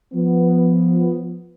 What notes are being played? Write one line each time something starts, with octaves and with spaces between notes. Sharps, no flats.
F3 B3